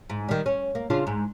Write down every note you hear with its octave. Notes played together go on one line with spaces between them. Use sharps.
G#2
D#3 G3
C#4
A#3
C#3 D4 F4
G#2